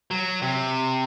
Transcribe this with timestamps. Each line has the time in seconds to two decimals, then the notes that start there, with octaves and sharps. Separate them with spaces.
0.11 F#3
0.42 C3